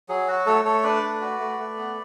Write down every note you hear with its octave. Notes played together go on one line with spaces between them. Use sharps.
F#3 G#4
F#4
A3 A4 C#5
A3 A4 C#5
D4 B4 D5
A3
F#4
A3
A3
B3